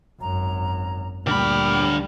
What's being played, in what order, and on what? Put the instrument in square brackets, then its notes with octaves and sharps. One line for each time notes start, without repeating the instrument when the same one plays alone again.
[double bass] G#1 F#2 [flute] A#5
[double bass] D2 G3 [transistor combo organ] A#2 G5 D6 [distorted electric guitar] D3 B5 [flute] F6